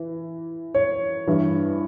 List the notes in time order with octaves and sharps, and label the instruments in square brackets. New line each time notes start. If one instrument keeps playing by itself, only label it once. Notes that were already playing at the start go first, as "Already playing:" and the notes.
Already playing: [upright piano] E3
C#5
G2 E3